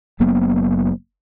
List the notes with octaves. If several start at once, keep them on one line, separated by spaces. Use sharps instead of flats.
F#1 F#3 A#3 B3